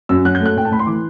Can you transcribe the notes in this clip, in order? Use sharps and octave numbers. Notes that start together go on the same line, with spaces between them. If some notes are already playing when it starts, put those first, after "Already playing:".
F#2 E6
F#3 F#6
G6
A3
F#6
A2 G5
A5
A2 B5
C6
E3 D6